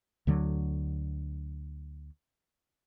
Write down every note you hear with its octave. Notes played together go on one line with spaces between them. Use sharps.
D2 D3 F#3